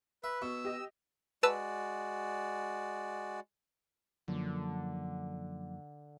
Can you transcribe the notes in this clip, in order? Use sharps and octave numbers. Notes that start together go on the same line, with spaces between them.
B4 E5
B2 C#6 E6
G4 D#5
G#3 F#4 B4 D5 A5 E6
F#2 D3 F3 A#3